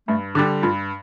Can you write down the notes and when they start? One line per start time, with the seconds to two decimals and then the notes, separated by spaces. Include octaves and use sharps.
0.08 G2 A3
0.35 D3 G3 D4
0.63 G2 F4